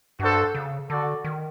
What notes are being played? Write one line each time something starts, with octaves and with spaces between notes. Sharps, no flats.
G2 D4 F#4 A4 C5
C#3
D3 F#4 A4 D5
D#3